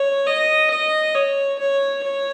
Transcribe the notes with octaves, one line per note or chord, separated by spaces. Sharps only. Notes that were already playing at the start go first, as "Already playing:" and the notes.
Already playing: C#5
D#5
D#5
C#5
C#5
C#5